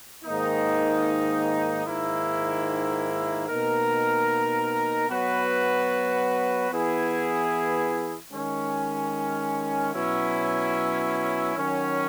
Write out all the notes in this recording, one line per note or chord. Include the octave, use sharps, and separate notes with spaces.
G#2 D#3 A#3 D#4
G#2 D#3 A#3 E4
B2 A#3 D#4 A#4
F#3 B3 F#4 B4
E3 B3 E4 G#4
D#3 G#3 C#4
B2 F#3 C#4 E4
D#3 F#3 C#4